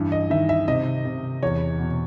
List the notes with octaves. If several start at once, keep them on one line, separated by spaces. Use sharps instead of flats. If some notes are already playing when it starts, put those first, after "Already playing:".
Already playing: G2 E3
D#5
D#3 E5
E5
C3 D#5
C3
E2 C#5
B2